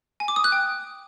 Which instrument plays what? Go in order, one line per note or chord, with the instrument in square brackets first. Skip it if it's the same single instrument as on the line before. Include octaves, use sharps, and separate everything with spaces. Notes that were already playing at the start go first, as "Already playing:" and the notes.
[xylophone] G#5
D6
D#6
F#6
G5